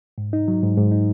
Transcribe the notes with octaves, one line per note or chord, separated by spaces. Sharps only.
G#2
D#4
F#3
G#2
G#2
D#4